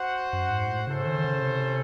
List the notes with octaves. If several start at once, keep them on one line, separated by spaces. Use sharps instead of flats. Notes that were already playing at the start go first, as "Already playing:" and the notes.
Already playing: F#4 C5 F#5
F#2
G#2
A2
C#3 C#4 E4 A4 C5
D#3
D#3
C#3
C3